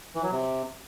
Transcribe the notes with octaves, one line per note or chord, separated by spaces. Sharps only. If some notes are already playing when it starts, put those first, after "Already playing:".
E3
F#3
C3